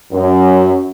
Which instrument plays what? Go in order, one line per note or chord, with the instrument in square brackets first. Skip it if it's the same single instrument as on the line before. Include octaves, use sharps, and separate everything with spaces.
[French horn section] F#2